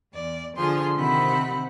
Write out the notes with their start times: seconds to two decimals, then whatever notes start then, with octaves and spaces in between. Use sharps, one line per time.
0.14 E2 D5
0.56 D3 F3 G#4 C6
0.95 C3 D#3 C4 F#5 B5